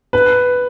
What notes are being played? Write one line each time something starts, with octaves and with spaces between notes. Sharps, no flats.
B4